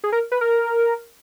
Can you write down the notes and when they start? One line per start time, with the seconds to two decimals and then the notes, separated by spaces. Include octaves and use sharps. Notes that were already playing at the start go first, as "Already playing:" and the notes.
0.04 G#4
0.12 A#4
0.32 B4
0.41 A#4